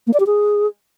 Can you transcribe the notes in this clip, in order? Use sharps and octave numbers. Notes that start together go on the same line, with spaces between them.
A#3
D5
G4
G#4